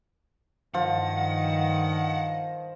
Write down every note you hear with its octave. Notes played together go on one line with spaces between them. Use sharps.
G2 D#3 F3 F#5